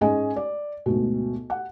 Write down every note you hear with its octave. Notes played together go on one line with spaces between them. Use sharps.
G#2 G#3 C#4 D#5 G#5
D5
D2 G#2 B2
F#5